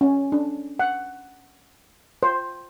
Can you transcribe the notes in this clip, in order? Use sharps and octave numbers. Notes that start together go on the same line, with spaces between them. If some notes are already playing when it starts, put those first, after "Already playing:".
C#4
D4
F#5
C5